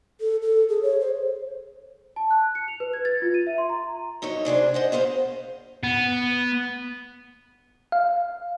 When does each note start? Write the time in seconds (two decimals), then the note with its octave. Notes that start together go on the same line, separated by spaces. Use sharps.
0.20 A4
0.42 A4
0.69 G#4
0.83 C#5
1.00 C5
2.16 A5
2.31 F#6
2.55 C#7
2.68 F7
2.80 B4
2.93 G#6
3.05 A6
3.22 F4
3.34 D#7
3.47 E5
3.58 C6
3.69 A#5
4.22 F#2 D#4 E4 C#5
4.45 C3 D4 G#4 C5
4.74 C5 D#5 F#5
4.92 B3 G#4 C5 F5
5.84 B3
7.92 F5